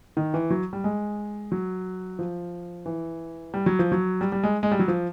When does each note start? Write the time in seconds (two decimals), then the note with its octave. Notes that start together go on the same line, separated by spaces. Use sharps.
0.17 D#3
0.34 E3
0.50 F#3
0.73 G3
0.84 G#3
1.52 F#3
2.19 F3
2.86 E3
3.54 G3
3.66 F#3
3.79 F3
3.92 F#3
4.21 G3
4.32 G3
4.43 G#3
4.63 G#3
4.71 G3
4.79 F#3
4.88 F3